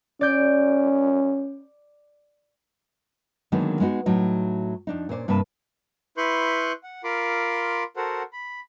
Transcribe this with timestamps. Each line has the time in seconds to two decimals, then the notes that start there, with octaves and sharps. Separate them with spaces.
0.21 C#4 D5 G6
3.52 D3 D#3 F#3 G#3 A#3 B3
3.80 G#3 B3 D#4 F#4
4.06 A2 F#3 D#4
4.87 F2 D4 D#4
5.09 A#2 C#4 C5 D5
5.28 G2 C3 A#3 B4 A5
6.17 E4 B4 C6 C#6 F#6 G6
6.83 F#5
7.04 F4 A#4 B5 C6 D6
7.96 F#4 A4 A#4 C5 F#5
8.33 B5